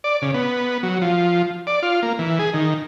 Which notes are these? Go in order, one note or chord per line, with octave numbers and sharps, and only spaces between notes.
D5
C#3
B3
F#3
F3
D5
F4
A#3
E3
G#4
D#3